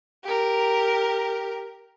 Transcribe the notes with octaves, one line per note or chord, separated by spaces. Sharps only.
G4 A#4